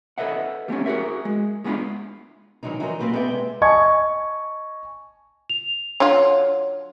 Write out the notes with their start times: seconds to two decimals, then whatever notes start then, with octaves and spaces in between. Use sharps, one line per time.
0.18 A4 B4 D#5 E5 F#5
0.68 G3 A3 C4 C#4
0.86 F#4 G#4 A#4 E5
1.25 G#3
1.64 A2 G#3 B3 D4 F4
2.63 D#3 E3 F#3 G#3 D4 D#4
2.80 E3 F#3 G3 D#4 A#4 C5
2.99 A#3 C4 F#4 G4 B4 C5
3.13 B3 G#4 A4 D5 E5 G5
3.29 C3 G#3
3.62 D#5 G#5 A5 C#6 G#6
5.50 F7
6.00 D3 F#3 F4 C#5